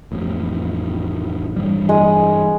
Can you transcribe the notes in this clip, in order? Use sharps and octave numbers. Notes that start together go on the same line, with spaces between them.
A1 F2
G2 E3 G3
G#3 D#6